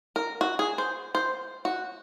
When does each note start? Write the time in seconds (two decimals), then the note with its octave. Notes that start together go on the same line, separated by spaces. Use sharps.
0.16 A#4
0.41 F#4
0.59 G#4
0.78 C5
1.15 C5
1.65 F#4